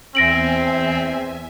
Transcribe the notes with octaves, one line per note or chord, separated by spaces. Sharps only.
E2 C4 E5 G#5 A#6 D7 F#7